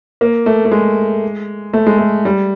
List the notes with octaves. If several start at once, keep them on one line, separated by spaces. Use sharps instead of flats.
A#3
A3
A3
G#3
A3
G#3
A3
G3